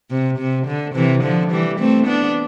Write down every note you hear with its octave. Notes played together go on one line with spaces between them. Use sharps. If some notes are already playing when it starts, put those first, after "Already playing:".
C3
C3
D3
C3 E3
D3 F3
E3 G3
A3 C4
B3 D4